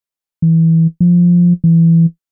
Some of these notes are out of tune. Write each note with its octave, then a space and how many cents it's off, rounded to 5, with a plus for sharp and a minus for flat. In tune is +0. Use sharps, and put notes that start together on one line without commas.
E3 -15
F3 +5
E3 +10